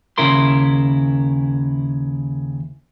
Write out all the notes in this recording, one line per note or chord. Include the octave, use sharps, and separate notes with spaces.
D#2 C#3 E4 A#4 C6